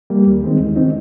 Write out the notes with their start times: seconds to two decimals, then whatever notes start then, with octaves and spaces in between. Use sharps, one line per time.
0.10 G3 A#3
0.26 D#2
0.43 D#3 G#3 C4 D#4
0.60 D#2
0.76 D#3 G#3 C4 D#4